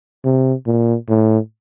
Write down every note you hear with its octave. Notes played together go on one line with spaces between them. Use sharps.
C3
A#2
A2